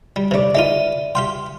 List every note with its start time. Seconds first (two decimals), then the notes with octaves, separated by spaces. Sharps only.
0.16 G3
0.31 C3 A3 B4 D5
0.55 G#3 D#4 F4 E5 D#7
1.15 G4 F5 G5 C6